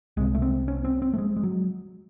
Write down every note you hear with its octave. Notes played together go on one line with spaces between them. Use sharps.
C2 C3 G#3
A3
C4
C#4
C4
C4
A3
G#3
G#3
F#3